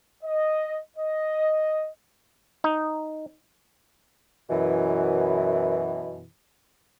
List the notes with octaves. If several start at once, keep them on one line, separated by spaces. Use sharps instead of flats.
D#5
D#5
D#4
F#2 B2 E3